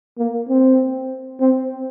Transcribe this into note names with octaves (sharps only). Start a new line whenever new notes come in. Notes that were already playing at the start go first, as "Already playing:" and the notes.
A#3
C4
C4